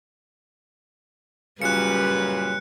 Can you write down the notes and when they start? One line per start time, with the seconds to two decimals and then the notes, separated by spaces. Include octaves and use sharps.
1.62 F#2 A#2 C#3 G3 B4 F#6 C#7